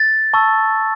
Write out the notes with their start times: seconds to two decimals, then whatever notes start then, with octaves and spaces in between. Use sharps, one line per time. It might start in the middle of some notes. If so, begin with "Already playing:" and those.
Already playing: A6
0.34 A5 C#6 E6